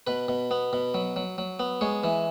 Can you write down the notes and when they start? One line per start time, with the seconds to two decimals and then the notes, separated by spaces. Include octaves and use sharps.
0.07 B2 B4
0.28 B2
0.51 B3
0.73 B2
0.94 F#3
1.16 F#3
1.38 F#3
1.59 B3
1.81 G#3 C#5
2.04 E3